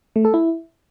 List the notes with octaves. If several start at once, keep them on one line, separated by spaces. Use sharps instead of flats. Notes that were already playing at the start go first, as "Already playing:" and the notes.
A3
A4
E4